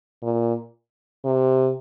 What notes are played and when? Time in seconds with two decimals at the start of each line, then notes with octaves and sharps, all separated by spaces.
0.23 A#2
1.25 C3